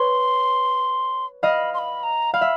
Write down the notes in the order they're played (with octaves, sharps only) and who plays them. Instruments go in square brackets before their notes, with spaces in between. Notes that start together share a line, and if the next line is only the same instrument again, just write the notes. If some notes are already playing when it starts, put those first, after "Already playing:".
Already playing: [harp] B4 C#5 [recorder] C6
[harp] D#5 F5 [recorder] B5
[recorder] C6
B5
A#5
[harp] F5 [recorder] B5
[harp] E5